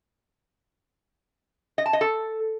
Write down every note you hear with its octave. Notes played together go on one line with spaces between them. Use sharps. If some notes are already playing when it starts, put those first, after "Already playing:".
D#5
A5
D#5
A4